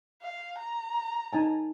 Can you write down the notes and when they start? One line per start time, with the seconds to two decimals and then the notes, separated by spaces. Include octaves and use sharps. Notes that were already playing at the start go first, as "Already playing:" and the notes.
0.23 F5
0.59 A#5
1.33 D#4 G#5 A5